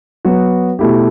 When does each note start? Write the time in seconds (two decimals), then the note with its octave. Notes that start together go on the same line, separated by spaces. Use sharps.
0.25 F#3 B3 F#4
0.79 B2 A3 E4 G4